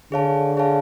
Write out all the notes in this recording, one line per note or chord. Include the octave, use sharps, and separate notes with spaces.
D3 G#4 C#5 F5 A5
G#4 C#5 F5 A5